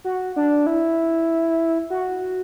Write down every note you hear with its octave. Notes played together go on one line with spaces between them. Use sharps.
F#4
D4
E4
F#4